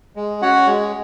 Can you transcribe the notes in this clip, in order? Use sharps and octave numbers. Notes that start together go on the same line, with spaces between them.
G#3
C#4 F#4 C#5 F#5
G#3